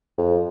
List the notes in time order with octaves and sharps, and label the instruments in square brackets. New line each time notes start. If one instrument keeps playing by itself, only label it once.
[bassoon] F2